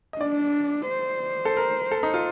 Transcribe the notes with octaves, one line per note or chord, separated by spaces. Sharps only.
D#5
D4 D5
C5
A4
A#4
A4
D#4
F4